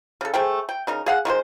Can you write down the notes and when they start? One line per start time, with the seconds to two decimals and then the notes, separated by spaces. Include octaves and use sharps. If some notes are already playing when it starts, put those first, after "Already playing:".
0.21 C#3 A4
0.34 A3 G#4 C5 G5
0.69 G5
0.87 C#3 D#4 A#4
1.06 G#4 F5 F#5
1.25 D#3 G#3 F#4 C5